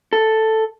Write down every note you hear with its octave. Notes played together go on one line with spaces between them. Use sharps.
A4